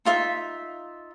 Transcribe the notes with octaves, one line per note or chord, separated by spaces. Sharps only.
D#4 F4 E5